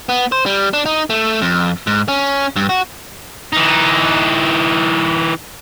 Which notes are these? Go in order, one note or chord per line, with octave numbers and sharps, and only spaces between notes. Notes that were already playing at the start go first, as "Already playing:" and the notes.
B3
C5
G3
D4
D#4
A3
F2
G#2
C#4
G2
F#4
E3 D#4